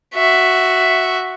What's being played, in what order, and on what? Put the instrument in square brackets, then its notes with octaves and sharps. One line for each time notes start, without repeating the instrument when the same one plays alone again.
[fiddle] F#4 E5